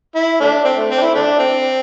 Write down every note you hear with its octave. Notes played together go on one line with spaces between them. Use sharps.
E4
A3 D4
C4
A3
C4
D4
E4
A3 D4
C4